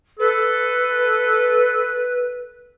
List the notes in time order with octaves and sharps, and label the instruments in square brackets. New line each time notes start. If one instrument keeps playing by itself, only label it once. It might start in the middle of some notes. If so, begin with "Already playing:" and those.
[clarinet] A4 [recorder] B4